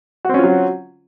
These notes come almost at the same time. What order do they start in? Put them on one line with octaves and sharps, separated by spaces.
F#4 C4 C#4 F4 F#3